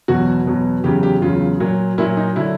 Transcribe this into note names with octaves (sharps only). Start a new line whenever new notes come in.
E2 B2 F#3 F#4
E2 B2 F#3
E2 C#3 F#3 G4
G4
E2 C#3 F#3 F4
A#2 F#3
A#2 F#3 E4
D#4
D3 F#3 E4